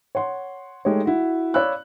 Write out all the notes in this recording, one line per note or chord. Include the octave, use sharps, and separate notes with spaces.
C#5 F#5 C6
G#3 A3 D#4 G4 C#5
E4 F#4
C#5 D5 F5 B5 E6 F#6